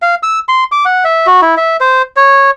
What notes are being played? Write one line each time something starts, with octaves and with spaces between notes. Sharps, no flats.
F5
E6
C6
D6
F#5
E5
F#4
E4
E5
C5
C#5